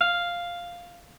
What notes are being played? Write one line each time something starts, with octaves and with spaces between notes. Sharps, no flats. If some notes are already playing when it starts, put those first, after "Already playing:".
F5